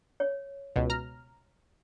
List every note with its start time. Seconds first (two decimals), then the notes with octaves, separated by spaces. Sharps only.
0.20 C#5
0.76 C#2 B2
0.90 A#5 F6